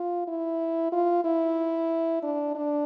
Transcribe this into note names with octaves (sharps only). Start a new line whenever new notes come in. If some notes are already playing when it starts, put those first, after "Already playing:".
Already playing: F4
E4
F4
E4
D4
D4